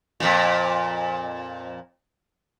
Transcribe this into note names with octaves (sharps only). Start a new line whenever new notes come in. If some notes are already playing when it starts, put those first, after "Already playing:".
F2 A#2